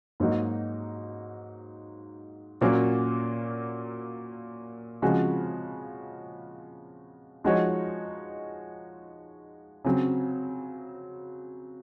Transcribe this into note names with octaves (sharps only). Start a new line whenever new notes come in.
G#2 F#3 A#3 D#4 F#4
A#2 F#3 A#3 C#4 F#4
C#3 F3 G#3 C4 F#4
F3 G#3 D#4 F#4 C#5
C#3 F#3 C4